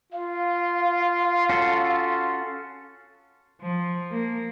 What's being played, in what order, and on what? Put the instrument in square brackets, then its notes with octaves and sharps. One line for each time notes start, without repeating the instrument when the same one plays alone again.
[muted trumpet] F4 [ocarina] F5
[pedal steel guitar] C#4 F#4 A4
[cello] F3
A#3